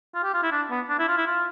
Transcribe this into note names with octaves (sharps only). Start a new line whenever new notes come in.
F4
G4
F4
E4
D4
B3
D4
E4
F4
E4
F4